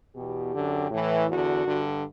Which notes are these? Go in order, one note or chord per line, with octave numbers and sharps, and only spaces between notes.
E2 B2 G4
F#2 D3
A2 E3
E2 D3 F#4
G2 D3